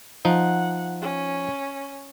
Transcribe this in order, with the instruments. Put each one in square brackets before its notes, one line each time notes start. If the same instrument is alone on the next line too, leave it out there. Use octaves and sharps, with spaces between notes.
[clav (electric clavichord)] F3 D#4 [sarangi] F#5
[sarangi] C#4